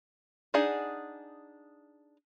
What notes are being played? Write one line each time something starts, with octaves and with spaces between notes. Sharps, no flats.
D4 D#4 G#4 F#5